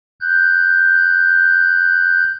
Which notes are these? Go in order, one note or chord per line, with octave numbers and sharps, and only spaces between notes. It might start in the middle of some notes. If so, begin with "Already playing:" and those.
F#6 G6